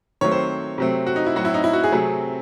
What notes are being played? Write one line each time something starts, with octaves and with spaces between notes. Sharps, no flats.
D#3 F#3 A3 C4 C#5
C5
C3 F#3 A3 C4
F#4
D#4
E4
A2 F#3 C4 F#4
E4
D#4
E4
F#4
G#4
C3 F#3 A3 C4